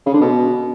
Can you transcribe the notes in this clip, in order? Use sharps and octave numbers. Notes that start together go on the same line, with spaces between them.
C#3
D3
B2